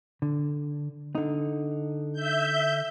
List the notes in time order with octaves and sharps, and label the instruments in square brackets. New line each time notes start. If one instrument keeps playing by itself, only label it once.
[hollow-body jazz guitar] D3
D3 D#4
[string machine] E5 G6